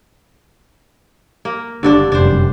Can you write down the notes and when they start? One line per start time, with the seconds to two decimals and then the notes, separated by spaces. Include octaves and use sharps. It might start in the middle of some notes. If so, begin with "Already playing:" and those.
1.45 A#3
1.83 F#1 G2 D3 D4
2.12 F1 F#2 G3 D4 C5